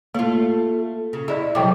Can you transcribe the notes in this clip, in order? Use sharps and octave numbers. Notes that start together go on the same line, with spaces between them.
A3 A#3 F4
C#3
E4 G#4 D5 D#5
C3 F#3 A3 G5 D6